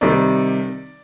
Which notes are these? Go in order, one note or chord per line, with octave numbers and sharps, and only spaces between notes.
C3 D#3 G3 D5